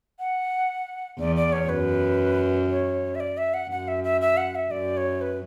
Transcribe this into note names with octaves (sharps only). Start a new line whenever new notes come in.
F#5
E2 D5
D5
C#5
F#2 B4
C#5
E5
D5
E5
F#5
F#2 F#5
E5
E5
E5
F#5
E5
F#2 D5
C#5
B4